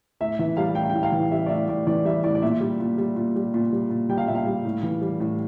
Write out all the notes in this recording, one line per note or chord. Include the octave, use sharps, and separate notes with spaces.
A2 E5
E3 E5
G3 F5
A2 G5
F5
G5
A2
F5
E3
G3 E5
D5
A2 E5
A2 D5
E3 D5
G3 E5
A2 D5
D5
A#2 E5
G3
A#2
G3
A#2
G3
A#2
G3
A#2
G3 G5
F5
A#2 E5
F5
G3
A2
E3
G3
A2